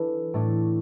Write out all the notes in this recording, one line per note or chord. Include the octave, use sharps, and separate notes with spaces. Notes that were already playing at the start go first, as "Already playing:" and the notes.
Already playing: E3 D4 A4
A2 A3 D4